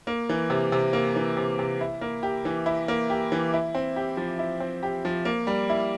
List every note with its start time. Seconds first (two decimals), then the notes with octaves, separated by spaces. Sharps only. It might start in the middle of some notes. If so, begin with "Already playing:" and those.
0.07 A#3
0.29 E3
0.50 C3
0.72 C3
0.93 A#3
1.16 E3
1.37 C3
1.59 C3
1.81 E4
2.01 A#3
2.23 G4
2.45 E3
2.66 E4
2.88 A#3
3.10 G4
3.32 E3
3.54 E4
3.75 C4
3.96 G4
4.17 F3
4.39 E4
4.60 C4
4.83 G4
5.05 F3
5.25 A#3
5.47 G3
5.70 E4